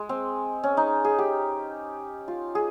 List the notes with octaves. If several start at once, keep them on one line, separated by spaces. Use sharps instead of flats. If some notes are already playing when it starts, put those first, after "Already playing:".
Already playing: G#3
C4
C#4
D#4
G#4
G4
F4
G#4